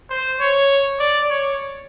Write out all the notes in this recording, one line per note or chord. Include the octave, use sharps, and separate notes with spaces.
C5
C#5
D5
C#5